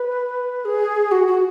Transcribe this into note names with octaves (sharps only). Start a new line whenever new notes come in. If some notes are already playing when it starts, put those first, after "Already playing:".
Already playing: B4
G#4
F#4
F#4